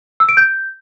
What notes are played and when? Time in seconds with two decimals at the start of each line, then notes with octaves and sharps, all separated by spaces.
0.20 E6
0.29 D7
0.37 G6